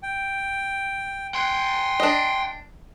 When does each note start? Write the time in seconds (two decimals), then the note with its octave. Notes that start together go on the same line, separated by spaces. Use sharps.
0.03 G5
1.35 F#5 G5 C6
2.00 D4 D#5